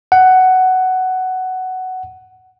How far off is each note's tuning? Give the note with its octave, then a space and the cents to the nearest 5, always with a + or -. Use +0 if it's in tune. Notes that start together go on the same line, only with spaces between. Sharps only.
F#5 +10